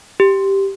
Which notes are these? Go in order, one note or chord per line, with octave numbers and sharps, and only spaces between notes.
G4